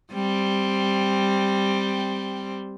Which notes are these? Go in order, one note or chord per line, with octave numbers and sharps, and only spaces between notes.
G3 C4